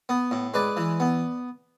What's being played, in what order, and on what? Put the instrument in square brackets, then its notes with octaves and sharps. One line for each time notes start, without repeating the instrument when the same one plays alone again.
[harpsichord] B3
A2
G#3 B4 D5
E3
B3